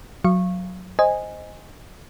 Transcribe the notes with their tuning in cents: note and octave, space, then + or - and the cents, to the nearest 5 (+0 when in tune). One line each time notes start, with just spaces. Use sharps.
F#3 -15 F5 -25 C#6 -20
C5 +0 D#5 +0 G#5 -10